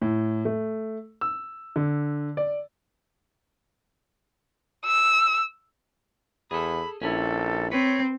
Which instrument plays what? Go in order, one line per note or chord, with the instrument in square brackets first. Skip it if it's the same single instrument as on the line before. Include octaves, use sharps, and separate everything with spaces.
[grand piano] A2
A3
E6
D3
D5
[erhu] E6
[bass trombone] E2 [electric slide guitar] G#4 A4 [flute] B5
[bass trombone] A#1 [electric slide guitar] C#4 E4 [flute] A4
[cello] C4 [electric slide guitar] B4 [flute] C#5